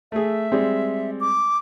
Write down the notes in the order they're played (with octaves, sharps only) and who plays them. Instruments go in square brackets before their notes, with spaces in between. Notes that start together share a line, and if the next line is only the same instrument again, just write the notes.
[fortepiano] A3 G#4 [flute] E5
[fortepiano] G3 G#3 C4
[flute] D6